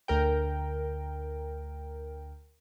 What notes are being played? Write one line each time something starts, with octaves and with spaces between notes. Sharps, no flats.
D2 A#4 G5